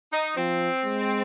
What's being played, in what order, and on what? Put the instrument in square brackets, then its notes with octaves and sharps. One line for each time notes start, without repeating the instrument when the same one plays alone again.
[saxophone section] D#4
[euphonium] F3 [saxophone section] C4
[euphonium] G#3